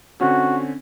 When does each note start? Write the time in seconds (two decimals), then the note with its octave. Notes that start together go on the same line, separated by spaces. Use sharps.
0.21 D3 C4 C#4 F#4